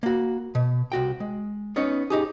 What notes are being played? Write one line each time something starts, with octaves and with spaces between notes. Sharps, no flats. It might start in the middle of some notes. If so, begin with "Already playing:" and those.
A#3 F#4
B2
C2 F#4 G5
G#3
B3 C#4 D#4 C#5
D#4 G4 G#4